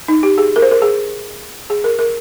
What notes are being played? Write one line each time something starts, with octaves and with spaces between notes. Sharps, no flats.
D#4
G4
G#4
A#4
C5
A#4
G#4
G#4
A#4
A#4